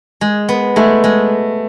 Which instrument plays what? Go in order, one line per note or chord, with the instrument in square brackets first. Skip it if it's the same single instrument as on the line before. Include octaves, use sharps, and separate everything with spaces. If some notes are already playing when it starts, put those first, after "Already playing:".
[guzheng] G#3
B3
[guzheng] G#3 [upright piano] A3
[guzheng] G#3